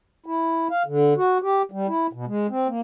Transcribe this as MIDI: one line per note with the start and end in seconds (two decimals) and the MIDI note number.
0.26 0.68 64
0.71 0.83 77
0.86 1.14 50
1.17 1.38 66
1.42 1.62 67
1.72 1.87 55
1.88 2.07 64
2.13 2.25 47
2.27 2.47 56
2.50 2.68 60
2.68 2.81 58